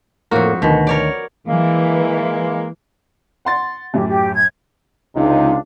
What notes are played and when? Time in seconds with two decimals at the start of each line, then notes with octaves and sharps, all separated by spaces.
0.31 F2 A2 A#3 F#4 A#4
0.62 D2 B2 D#3
0.87 A#4 C#5 D5
1.48 E3 G#3 A#3
3.45 F#5 C6 A6
3.94 F#2 A2 G4
4.08 G4
4.36 G#6
5.16 C#2 C3 D4 D#4 F4 F5